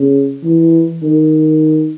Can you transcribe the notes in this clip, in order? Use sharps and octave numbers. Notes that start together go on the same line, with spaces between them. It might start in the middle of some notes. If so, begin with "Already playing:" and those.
Already playing: C#3
E3
D#3